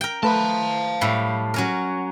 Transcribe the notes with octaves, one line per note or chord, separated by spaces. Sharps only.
A#4 G5
A3 B4 F5 A5
A2 G3
F#3 C#4 A#4